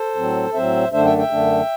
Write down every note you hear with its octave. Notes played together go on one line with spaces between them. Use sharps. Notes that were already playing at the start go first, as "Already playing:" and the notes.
Already playing: A4 C5
A2 F#3 C4
A2 F#3 C4 C5 E5
F#2 D3 A3 D4 C5 E5
E5 G5
E5 G5
F#2 D3 A3 D4